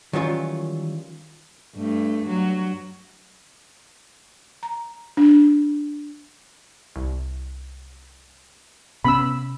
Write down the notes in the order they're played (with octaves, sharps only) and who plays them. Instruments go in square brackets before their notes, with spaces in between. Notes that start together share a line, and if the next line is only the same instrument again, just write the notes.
[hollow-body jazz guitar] D#3 E3 F#3 G3 C#4 F4
[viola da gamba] G2 A3
F#3
[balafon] A#5
D4
[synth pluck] C2
[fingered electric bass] C3 C#4 [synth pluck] B3 [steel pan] B5 E6